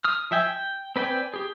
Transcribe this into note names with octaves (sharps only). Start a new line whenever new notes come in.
D#6 F6
F3 E5 G5 G#5
G5
C4 B4 D5 G5 G#5
G4 G#4